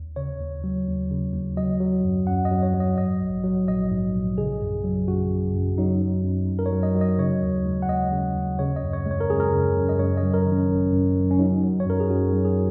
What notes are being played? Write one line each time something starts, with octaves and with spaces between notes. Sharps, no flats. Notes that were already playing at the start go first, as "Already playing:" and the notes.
Already playing: D#2
C#3 C#5
D#2
F#3
D#2
C#3
D#2
F#3 D#5
F#3
F#2
F#2 F#5
D#5
F#3
C#5
F#3
D#5
G#2 D#5
A#1
F#3
A#1 D#5
G#2
A#1
C#3 G#4
F#2
F#3
F#2 F#4
C#3
F#2
F#3 D#4
F#3
F#2
F#2
A#4
C#5
F#3
D#5
F#3
D#5
C#3 C#5
D#2
G#3
F#5
D#2 D#5
C#3
D#2
C#3 C#5
D#5
F#2
C#5
G#3 C#5
A#4
F#2 G#4
A#4
C#3
F#2
D#5
F#2 C#5
D#5
F#3
A#4
D#3
C#4
G#1
F#2
F#3
C#4
F#3 D#4
F#3
C#5
F#2 A#4
G#4
F#2 F#4
F#3
G#4